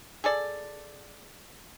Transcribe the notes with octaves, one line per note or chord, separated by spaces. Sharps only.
G#4 A4 D5